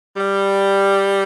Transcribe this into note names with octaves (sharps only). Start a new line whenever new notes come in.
G3